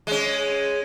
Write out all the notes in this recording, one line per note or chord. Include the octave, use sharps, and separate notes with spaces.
G#3 C#4